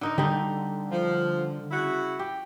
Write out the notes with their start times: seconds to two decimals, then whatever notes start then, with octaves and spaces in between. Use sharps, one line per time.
0.01 D3 D#4 D#5
0.18 D3 G3 D#4
0.91 F3
1.71 C#3 E4 F#4
2.19 G4